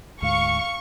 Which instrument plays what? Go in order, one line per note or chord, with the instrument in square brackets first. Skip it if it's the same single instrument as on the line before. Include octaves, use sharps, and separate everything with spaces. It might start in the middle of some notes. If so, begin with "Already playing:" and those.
[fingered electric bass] D2 G#2 [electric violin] F5 [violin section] C#6